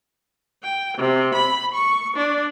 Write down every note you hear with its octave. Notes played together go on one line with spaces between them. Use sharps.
G5
C3
B5
C#6
D4